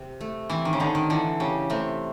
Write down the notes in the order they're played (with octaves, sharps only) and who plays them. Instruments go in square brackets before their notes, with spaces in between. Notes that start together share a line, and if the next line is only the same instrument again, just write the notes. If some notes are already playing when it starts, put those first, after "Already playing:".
Already playing: [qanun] C3
A3
[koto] E3 [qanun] C4
[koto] D#3
C#3
[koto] D3 [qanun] D#4
[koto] D#3
[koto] D3 [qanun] E3
[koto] C#3 [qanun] G4
[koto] C3 [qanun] A3